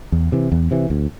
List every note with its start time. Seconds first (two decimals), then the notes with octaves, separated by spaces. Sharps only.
0.12 E2
0.32 C3 E3
0.52 E2
0.71 C3 E3
0.90 D2